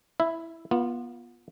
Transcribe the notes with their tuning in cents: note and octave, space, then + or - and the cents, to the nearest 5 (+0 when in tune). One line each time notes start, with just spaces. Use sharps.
E4 +0 E5 +0
B3 -30 F4 +0